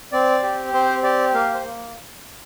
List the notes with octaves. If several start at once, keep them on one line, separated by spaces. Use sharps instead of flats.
C4 D5
G4
C4 C5
G4 D5
A#3 F5
C5
A#3